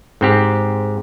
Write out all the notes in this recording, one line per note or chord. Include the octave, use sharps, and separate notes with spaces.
G#2 C4 G4